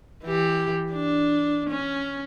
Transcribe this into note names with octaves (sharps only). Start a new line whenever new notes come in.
E3 G4
D4
C#4